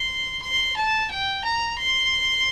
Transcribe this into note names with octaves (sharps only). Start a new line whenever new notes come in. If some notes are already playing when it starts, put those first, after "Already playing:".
Already playing: C6
C6
A5
G5
A#5
C6